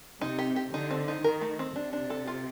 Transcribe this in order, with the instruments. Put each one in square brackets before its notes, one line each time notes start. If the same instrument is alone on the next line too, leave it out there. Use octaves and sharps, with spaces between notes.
[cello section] C3 [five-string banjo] D#4
[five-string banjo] G4
G4
[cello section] D3 [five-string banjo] D#4
[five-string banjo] C4
D#4
[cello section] D#3 [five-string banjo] A#4
[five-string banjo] A3
C4
[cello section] C3 [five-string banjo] D4
[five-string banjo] D4
A4
F4